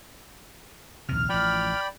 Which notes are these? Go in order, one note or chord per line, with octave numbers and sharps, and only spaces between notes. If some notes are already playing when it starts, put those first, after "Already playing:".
A#1 D#2 C3 F6
A1 F3 D5 G5 B5